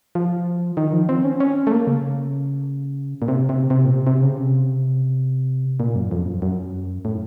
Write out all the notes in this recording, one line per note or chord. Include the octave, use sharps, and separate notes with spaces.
F3
D#3
F3
C4
C#4
C#4
A3
A#3
C#3
A#2
C3
C3
C3
A#2
C3
C3
C#3
C3
A#2
F#2
F2
F#2
F#2
A2